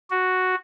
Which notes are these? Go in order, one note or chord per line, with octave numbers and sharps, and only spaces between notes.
F#4